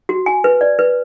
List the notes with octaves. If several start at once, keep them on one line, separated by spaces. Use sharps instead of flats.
F#4
G#5
B4
D5
B4